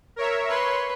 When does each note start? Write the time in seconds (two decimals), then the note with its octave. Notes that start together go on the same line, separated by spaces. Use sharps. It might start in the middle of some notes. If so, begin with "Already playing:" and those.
0.16 A#4 C#5 E5
0.49 B4 C#5 C6